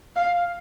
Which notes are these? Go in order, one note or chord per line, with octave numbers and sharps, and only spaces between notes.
F5